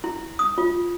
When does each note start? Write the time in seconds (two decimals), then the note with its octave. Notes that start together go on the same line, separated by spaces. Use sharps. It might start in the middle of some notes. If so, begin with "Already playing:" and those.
0.04 E4
0.39 D#6
0.58 F4